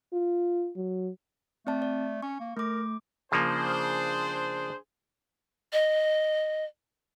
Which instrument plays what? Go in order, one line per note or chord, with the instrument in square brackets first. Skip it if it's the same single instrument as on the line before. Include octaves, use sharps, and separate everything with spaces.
[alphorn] F4
F#3
[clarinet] A3 [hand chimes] C4 D5 A5
[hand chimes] D5
[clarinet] C#4 [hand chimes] C#6
[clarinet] A#3
[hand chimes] A3 D6 [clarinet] A#4
[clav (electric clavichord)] C#3 F3 A#3 [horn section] D4 G#4 C5
[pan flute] D#5